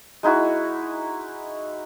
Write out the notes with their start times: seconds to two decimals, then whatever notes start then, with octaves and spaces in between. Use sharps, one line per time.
0.23 G#3 D#4 E4 F#4